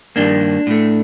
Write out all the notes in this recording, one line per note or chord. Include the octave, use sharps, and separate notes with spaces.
G2 D#3 A#3 D4
A2 A3